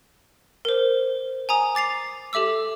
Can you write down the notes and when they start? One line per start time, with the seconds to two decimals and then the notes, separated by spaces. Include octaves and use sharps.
0.65 A#4 C5
1.49 G#5 A#5 D#6
1.75 D6 A6 C7 F7
2.33 G4 A4 E5 D6 E6